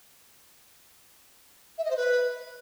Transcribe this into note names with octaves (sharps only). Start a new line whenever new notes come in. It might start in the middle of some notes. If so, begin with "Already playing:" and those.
E5
D#5
C5
B4